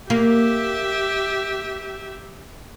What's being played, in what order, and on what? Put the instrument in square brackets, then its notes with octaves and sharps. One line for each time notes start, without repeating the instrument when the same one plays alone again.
[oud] A#3 [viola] G4 E5